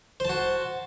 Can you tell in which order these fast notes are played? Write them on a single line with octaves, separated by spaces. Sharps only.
C5 A5 F#4